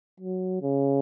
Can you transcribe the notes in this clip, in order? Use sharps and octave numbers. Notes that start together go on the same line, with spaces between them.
F#3
C#3